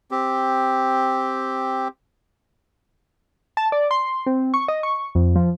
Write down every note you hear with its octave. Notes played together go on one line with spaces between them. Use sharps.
C4 G4
A5
D5
C6
C4
C#6
D#5
C#6
F2
F3